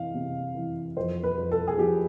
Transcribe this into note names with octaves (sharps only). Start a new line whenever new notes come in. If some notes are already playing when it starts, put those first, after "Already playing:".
Already playing: C3 E3 F5
C3
E3
F2 C5
B4
F2
A4
G#4
F3 G4